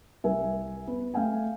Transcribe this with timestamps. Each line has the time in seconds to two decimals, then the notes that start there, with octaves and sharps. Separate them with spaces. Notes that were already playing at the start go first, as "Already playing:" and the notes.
0.24 C2 A#4 E5 G#5
0.87 B3 B4
1.14 A3 F5 G5 G#5